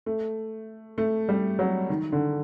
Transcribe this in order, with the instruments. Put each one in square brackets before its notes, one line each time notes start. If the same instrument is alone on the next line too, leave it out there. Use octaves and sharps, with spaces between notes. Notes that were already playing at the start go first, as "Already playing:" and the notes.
[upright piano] A3
A3
G3
F#3
D#3
D3